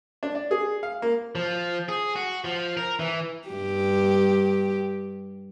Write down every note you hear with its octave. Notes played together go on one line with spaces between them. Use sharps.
D4
D5
G#4
F5
A#3
F3
G#4
F#4
F3
A#4
E3
G2 G4